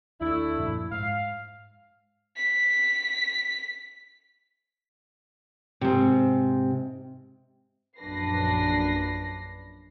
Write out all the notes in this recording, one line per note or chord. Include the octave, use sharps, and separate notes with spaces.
D#2 A3 D4 E4
F#2 A#2 F3
G#2 F5
B6
G#2 C3
A#1 F#2 D4 B4 A#6 C7